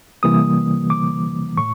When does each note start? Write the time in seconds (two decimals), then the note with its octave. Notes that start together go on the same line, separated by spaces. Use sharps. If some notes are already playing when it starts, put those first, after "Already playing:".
0.23 C3 E3 G3 A#3 D#6
0.90 D6
1.57 A2 C#6